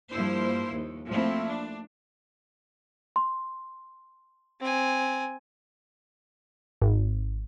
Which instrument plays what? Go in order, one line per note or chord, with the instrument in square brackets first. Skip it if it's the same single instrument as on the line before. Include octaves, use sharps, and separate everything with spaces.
[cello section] G2 F3 A#3 E4 C5
D#2
F3 A3 A#3 C4 E4
D4
[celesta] C6
[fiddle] C4 G#5
[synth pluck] G#1